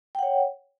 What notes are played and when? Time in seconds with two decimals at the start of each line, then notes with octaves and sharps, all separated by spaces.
0.15 G5
0.19 F#5
0.23 C#5